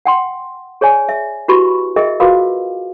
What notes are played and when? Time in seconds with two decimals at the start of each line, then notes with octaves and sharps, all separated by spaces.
0.05 F#5 G5 C6
0.81 G#4 C#5 D5 G#5
1.09 E5
1.48 E4 F#4 G4 B4 B5 C#6
1.96 G#4 A#4 D#5 E5 G5
2.20 F4 F#4 A#4 B4 F5 D6